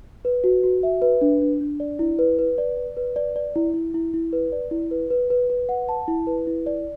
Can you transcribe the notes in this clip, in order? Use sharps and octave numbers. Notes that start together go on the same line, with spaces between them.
B4
F#4
F#4
E5
B4
D4
D4
D4
D5
E4
B4
B4
D5
D5
B4
D5
D5
E4
E4
E4
E4
B4
D5
E4
B4
B4
B4
B4
F#5
A5
E4
B4
E4
D5